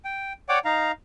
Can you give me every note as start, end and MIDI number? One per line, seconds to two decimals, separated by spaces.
0.05 0.33 79
0.49 0.59 73
0.49 0.59 74
0.49 0.59 78
0.49 0.59 79
0.49 0.59 86
0.65 0.92 63
0.65 0.92 77
0.65 0.92 82